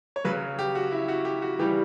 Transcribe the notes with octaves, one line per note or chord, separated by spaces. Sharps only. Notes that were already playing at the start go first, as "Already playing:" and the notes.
C#5
C#3 F#3 B4
G4
F#4
E4
F#4
G4
F#4
C#3 E3 G3 G4